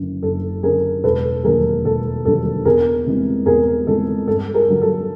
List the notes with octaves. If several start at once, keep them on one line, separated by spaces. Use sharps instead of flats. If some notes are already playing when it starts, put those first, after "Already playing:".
Already playing: F#1 F#2 D3
F#1 A4
F#2 D3 G#4 A#4
E1 A4 B4
D#2 D3 F#3 A#3 G#4 A#4
E1 A4
D#2 D3 F#3 A#3 A4
E2 G#4 A#4
C3 E3 G#3
E2 G#4 A#4
C3 E3 G#3 A4
G2 A4
G#4 A#4
D3 F#3
A4